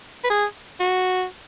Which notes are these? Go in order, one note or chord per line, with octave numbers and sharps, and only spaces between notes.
B4
G#4
F#4